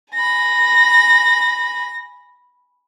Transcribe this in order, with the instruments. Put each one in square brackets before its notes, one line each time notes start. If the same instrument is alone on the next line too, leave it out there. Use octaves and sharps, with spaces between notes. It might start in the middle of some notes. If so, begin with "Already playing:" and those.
[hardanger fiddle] G#5 B5 [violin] A#6